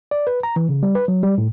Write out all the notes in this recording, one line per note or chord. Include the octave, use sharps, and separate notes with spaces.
D5
B4
A#5
E3
C#3
G3
B4
F#3
G3
A2